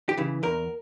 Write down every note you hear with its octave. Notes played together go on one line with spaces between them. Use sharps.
G4
C#3 E3
E2 A#4